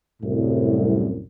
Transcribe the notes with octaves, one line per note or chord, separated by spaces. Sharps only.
C2 F#2 A2